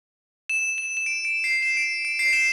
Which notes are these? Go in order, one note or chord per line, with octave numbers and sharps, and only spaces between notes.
E7
E7
E7
D7
D7
C7
E7
D7
D7
C7
E7